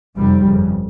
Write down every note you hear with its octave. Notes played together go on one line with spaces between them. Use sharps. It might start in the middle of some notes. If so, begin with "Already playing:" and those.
F1 F2 C3 G3
G1 F2 C#3